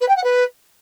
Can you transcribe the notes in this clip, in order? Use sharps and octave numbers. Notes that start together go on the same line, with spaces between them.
B4
G5
F#5
B4